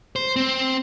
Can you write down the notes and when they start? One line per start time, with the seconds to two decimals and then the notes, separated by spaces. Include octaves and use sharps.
0.16 C5
0.36 C4